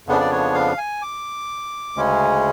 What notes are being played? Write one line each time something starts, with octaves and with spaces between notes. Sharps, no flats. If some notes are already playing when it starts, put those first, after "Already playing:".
F2 C#3 F3 B3 D4
D5
C#5
F5
G#5
D6
D2 C#3 G#3 C#4